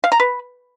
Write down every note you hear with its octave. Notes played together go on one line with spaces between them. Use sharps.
F5
A#5
B4